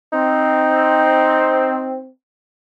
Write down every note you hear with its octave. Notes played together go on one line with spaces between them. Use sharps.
C4 D#4